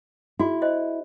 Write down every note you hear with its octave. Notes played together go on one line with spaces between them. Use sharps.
E4 F#4 G#4
C5 D#5